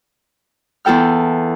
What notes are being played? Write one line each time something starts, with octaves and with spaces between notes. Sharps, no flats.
E2 E4 A4 G5 F6